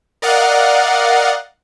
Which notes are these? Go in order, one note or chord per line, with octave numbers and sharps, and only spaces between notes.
A#4 D5 D#5 F5 F#5